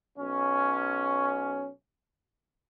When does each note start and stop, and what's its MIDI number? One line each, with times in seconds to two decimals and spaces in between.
0.18 1.69 35
0.18 1.69 61